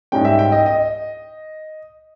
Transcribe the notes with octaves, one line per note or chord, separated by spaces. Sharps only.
G#2 G3 C#4 G5
E5
G5
D#5
D#5